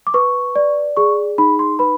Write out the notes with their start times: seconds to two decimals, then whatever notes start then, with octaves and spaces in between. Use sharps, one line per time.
0.07 D6
0.14 B4 C#6
0.56 D5
0.97 G#4 C#6
1.38 D#4 B5
1.59 C6
1.79 B4 B5